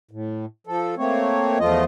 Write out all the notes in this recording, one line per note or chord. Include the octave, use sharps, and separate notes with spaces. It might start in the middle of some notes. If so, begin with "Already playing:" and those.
A2
F3 A4
A3 A#3 C4 C#5
E2 F3 A3 F4 D#5